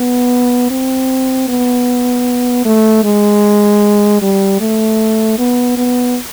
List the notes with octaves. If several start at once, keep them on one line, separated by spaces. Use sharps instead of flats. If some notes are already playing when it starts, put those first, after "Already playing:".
Already playing: B3
C4
B3
A3
G#3
G3
A3
B3
B3